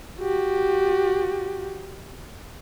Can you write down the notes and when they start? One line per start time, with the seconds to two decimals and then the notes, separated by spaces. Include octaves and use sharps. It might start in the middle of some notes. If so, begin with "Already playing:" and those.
0.20 F#4 G4